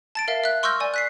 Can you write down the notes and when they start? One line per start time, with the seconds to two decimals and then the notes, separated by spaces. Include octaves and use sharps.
0.15 A5 A6 D7
0.28 A#4 E5 F5
0.44 E5 F#6
0.63 C6 C#6 E6 F6 G6 A#6
0.80 D5 G#5
0.94 F#6 B6 C7